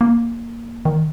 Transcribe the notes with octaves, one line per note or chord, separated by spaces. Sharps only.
A#3
D#3